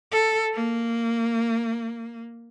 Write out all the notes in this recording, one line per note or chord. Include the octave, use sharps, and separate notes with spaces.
A4
A#3